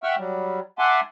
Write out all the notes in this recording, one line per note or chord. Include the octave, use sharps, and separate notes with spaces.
E5 F#5 G5 C#6 E6 F6
F#3 G3
E5 F#5 G#5 A5 C6 D6